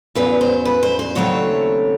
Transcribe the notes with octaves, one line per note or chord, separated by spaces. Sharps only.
E2 C#3 F#3 B4
C5
B4
C5
C5
D#2 C#3 F#3 A3 C4 C#5